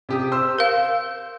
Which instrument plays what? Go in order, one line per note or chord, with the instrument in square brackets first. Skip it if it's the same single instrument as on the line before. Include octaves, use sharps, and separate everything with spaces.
[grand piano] C3 G4 D#6
C5 C6 E6
[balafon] A#4 F5